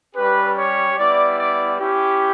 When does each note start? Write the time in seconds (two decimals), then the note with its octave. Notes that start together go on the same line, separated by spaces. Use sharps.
0.15 G3 C#4 G4 B4
0.56 C#5
0.96 G3 B3 E4 D5
1.37 D5
1.78 C#4 E4 G4